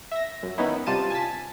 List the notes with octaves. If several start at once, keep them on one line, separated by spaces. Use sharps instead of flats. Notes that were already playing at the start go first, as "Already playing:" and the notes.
E5 A#6
F#2
D#3 B3 C#4 D#4 E4
C3 G3 F4 A5 A6 D#7
G#5 A5 A6 B6